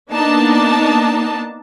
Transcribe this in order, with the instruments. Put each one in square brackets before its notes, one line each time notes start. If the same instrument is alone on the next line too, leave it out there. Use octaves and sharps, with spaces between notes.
[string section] A#3 B3 D4 D#4 A5